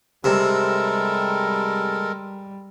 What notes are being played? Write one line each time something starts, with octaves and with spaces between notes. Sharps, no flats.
C3 G3 G#3 A4 A#4